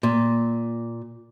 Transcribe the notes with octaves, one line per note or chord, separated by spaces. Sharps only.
A#2